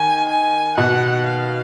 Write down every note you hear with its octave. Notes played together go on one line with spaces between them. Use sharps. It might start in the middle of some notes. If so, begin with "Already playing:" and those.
Already playing: D#3 G#5
G#5
B2 F#5
F5